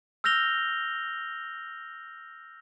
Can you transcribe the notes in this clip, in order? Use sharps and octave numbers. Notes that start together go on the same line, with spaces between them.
E6 F6 G6 A#6 F7 G7